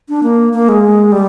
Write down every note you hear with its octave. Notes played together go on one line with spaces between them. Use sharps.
D4
A#3
A#3
G#3
G3